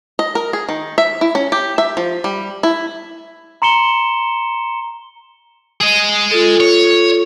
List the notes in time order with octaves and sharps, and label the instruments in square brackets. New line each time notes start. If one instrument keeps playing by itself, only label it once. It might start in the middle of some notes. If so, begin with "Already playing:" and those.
[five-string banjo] D#5
A#4
G#4
D#3
E5
E4
C#4
G4
E5
F3
G3
E4
[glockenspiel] A#5 C6 C#7 E7 G7
[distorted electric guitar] G#4 D#5
[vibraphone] F4 A4
[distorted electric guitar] C#5